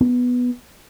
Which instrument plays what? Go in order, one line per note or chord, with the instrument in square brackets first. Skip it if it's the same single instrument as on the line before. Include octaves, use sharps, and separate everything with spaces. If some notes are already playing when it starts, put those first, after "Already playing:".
[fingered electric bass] B3